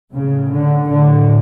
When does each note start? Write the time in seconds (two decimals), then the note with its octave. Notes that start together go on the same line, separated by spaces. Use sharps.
0.12 A2 C#3
0.51 D3
0.90 A2 D3